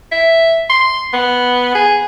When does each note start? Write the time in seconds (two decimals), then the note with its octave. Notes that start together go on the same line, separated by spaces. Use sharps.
0.12 E5
0.70 C6
1.13 B3
1.75 G#4